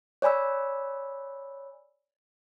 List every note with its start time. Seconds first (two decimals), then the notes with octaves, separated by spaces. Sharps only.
0.22 C#5 D5 G#5 B5 E6